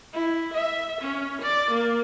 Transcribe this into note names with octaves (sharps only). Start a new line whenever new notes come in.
E4
E5
C#4
D5
A#3